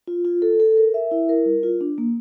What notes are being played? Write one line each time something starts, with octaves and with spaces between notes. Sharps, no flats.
F4
F4
A4
A4
A#4
E5
E4
A#4
G3
F4
D4
A#3